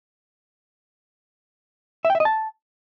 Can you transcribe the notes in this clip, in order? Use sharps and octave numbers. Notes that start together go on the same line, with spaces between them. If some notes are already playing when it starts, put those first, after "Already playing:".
E5
G5
E5
D#5
A5